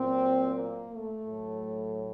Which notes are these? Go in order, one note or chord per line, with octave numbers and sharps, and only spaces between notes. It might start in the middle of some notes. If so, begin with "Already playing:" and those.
Already playing: A#2 F#3 C4
A#3
A3
A2 F#3